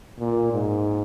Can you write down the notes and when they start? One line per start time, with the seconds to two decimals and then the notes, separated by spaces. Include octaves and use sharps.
0.19 A#2
0.52 G#2